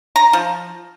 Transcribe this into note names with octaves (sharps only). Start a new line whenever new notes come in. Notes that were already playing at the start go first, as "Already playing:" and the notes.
A#5
F3